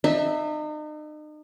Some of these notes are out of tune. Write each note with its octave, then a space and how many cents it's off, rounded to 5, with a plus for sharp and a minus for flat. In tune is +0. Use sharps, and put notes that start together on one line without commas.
D#4 -40 E5 -15